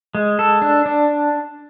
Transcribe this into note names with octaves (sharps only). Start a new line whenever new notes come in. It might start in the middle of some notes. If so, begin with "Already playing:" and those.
G#3
A4
D4
D4